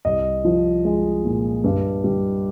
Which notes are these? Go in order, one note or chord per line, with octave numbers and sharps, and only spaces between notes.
C2 D#5
F3
G#3
A#2
G2
G3